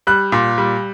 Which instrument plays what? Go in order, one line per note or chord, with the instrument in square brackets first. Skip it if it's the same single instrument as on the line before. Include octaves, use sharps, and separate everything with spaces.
[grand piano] G3 F#6
A#2
G3